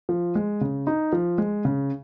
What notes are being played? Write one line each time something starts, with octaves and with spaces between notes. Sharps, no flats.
F3
G#3
C#3
D#4
F3
G#3
C#3